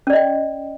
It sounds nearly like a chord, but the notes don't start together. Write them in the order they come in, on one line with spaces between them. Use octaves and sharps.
C#4 D5 D#5 G5